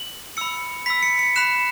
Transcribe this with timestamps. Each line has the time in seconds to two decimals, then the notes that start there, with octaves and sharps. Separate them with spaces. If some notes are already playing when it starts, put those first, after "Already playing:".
Already playing: F#7
0.37 B5 E6 C#7
0.86 B5 E6 B6
1.03 C#7
1.19 C#7
1.36 B5 F#6 E7